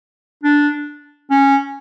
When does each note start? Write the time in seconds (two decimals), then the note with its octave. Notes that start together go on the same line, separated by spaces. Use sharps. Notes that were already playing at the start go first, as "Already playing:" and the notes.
0.43 D4
1.31 C#4